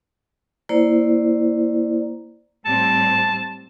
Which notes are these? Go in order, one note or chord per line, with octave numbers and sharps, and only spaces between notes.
A#3 E4 C5 D5
A2 G3 C4 A5